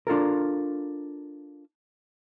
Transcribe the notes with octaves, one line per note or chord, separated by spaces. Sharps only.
D4 F4 A4 A#4